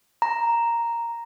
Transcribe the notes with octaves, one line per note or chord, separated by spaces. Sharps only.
A#5